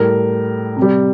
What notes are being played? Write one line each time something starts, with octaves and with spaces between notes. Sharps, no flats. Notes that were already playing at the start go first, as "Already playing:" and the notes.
Already playing: A2 G3 A#4
C3
G3